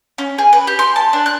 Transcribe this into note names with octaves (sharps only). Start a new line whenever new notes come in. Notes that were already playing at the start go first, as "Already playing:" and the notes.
C#4
G#4
B4
G4
C6
A5
D4
F#6